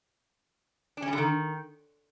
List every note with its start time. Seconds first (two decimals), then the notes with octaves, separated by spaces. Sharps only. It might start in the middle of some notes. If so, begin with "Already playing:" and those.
0.97 D4
1.02 C#4
1.08 G3
1.13 D3
1.18 D#3